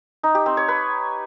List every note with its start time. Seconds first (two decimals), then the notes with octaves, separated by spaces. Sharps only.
0.23 D#4
0.35 G4
0.46 C4
0.57 C#5
0.68 B4